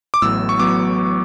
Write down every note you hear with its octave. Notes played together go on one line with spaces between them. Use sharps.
D6
A1 A2 F#3 B3 E6
C#6
F#3 B3 D6